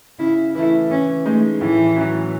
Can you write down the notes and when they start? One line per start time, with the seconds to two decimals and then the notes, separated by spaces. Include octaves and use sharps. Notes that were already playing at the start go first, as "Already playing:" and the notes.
0.19 C#3 E4
0.55 E3 A3 E4
0.90 E3 C#4
1.26 G#3 A3 D#4
1.61 A2 E3
1.96 F#3 C#4 F#4